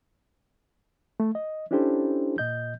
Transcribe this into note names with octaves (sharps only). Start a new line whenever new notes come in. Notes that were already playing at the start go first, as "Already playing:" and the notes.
A3
D#5
C#4 D4 E4 G4 A4 C5
A#2 D#5 G6